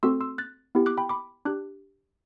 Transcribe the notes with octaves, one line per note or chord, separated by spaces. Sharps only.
A3 C4 F#4 A4 C6 E6
C6 E6
F#6 A6
B3 E4 G4
D6 F#6
G5 B5
B5 D6
D4 G4 D6 F#6